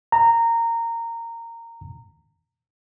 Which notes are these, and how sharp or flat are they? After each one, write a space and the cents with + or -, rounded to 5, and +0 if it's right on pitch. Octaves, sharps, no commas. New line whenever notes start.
A#5 -15